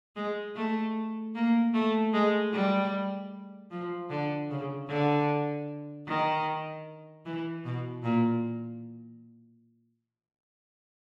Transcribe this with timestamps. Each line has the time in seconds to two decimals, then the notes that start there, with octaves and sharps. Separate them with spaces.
0.16 G#3
0.56 A3
1.35 A#3
1.74 A3
2.13 G#3
2.53 G3
3.71 F3
4.10 D3
4.50 C#3
4.88 D3
6.07 D#3
7.26 E3
7.65 B2
8.03 A#2